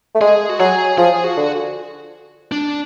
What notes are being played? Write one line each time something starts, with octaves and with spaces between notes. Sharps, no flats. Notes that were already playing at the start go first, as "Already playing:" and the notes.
A3
G#3 G#4
F#4
F#3 G#4
F3 G#4
F#4
D3
D4